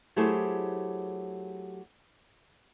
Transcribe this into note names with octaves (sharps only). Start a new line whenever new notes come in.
F#3 A3 E4 G4 G#4 C5